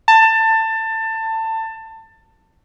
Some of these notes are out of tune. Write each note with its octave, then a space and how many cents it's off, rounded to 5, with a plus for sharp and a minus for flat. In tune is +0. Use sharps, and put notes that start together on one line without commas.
A5 +20